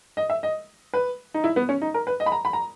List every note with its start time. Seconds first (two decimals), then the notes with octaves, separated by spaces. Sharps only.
0.17 D#5
0.30 E5
0.43 D#5
0.93 B4
1.34 D#4
1.44 E4
1.56 B3
1.69 C#4
1.82 D#4
1.94 A#4
2.07 B4
2.20 D#5
2.26 B5
2.32 A#5
2.45 B5
2.53 A#5